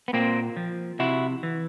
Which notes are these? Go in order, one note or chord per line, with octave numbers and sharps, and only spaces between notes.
B3
A#2 A#3 C4
F3
C3 E4 F#4
E3